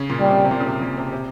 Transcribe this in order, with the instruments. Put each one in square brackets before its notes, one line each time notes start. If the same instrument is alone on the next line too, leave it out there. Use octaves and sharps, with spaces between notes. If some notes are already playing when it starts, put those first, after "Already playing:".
Already playing: [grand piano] C#3
A#2
[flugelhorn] G3
[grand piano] C3
C3
A#2
C#3
C3
A#2
C3
C3